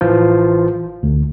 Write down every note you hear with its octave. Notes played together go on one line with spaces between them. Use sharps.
A1 E3 F4 C5
D2